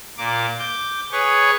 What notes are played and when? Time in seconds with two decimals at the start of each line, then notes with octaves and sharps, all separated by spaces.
0.17 A#2 A#3 D6
0.59 D6 G6
1.12 G#4 B4 C#5 C#6